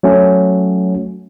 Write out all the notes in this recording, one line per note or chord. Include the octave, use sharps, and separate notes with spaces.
F#3 A3 C#4